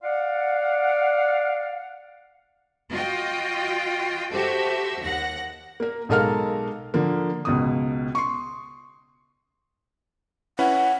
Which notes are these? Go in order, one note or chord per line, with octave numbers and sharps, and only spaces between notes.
D5 F5 F#5
F4 F#4 D#5 G5
F#4 G4 A4 C5 E5
D#2 F#5 A#6
A#3 A#4
B1 G#3 A4 A#4 F5 F6
D3 F3 A#3
C#2 B2 D#6
C6 C#6
C#4 E4 B4 F#5